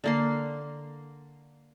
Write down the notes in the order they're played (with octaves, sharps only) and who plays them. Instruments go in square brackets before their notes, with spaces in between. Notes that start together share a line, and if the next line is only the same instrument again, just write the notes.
[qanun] D3 A#3 C6